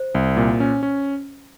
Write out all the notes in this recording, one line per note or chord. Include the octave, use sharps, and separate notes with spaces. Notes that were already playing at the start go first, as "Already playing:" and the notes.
Already playing: C5
C2
A#2
C#4
C#4